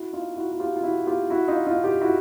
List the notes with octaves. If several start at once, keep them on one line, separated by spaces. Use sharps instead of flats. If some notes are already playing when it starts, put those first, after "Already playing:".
Already playing: E4 F#4
D#4 F4
E4 F#4
F#4
F4 G4
F4
E4 F#4
F4 G4
E4 F#4
D#4 F4
D#4 F4
F4 G4
E4 F#4